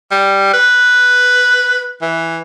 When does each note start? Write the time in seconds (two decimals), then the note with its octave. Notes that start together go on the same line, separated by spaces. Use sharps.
0.11 G3
0.53 B4
2.01 E3